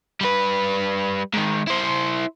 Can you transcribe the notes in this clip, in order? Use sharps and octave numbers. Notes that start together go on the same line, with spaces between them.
G3 B4
G#2 D#3
E4 C5